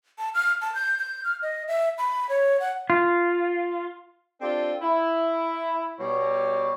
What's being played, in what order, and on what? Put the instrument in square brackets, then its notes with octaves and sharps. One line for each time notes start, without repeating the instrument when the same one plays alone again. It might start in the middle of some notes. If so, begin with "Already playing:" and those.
[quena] A5
F6
A5
G6
G6
F6
D#5
E5
B5
C#5
F#5
[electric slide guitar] F4
[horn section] C4 D4 F4 G4 A4 D5
E4
B2 G3 C#5